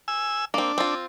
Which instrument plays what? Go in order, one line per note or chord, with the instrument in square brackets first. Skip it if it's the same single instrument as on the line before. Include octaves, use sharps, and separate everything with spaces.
[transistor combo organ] G#5 E6
[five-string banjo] A#3 C4 [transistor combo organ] D4
[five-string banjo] C4 F4